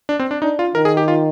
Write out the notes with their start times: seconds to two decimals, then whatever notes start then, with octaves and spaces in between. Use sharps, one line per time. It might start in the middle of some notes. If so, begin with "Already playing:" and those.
0.09 D4
0.19 C4
0.31 D4
0.42 D4 D#4
0.59 F4
0.75 D#3 A#4
0.85 G#4
0.97 G4
1.08 F4